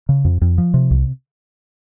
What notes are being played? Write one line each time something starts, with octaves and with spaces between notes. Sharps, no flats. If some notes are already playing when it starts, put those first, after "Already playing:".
C#3
F2
F2
F3
C3
C2